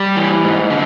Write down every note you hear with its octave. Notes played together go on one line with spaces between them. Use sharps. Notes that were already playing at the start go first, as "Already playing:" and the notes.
Already playing: G3
E3
G#2
D3